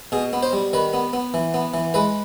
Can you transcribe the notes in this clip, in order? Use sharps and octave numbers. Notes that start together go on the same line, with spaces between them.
B2 G#4
B3
C5
G3
D#3 B4
B3
B3
E3
B3
E3
G#3 B4